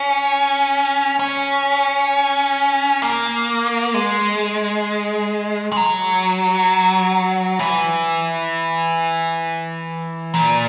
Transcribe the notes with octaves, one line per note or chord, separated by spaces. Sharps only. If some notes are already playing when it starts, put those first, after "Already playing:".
Already playing: C#4
C#4
A#3
G#3
G#3
F#3
E3
A#2